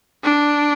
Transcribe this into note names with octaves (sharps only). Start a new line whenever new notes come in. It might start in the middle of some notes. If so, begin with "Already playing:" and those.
D4